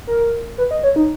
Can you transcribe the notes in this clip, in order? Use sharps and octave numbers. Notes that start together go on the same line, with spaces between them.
A#4
B4
D#5
C#5
D#4